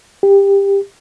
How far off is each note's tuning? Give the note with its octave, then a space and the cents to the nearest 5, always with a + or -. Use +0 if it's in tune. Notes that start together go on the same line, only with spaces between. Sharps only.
G4 +20